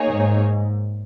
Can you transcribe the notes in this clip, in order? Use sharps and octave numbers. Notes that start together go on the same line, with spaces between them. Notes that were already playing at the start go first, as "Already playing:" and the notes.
Already playing: A#3 D#4 G#4 C#5
G#2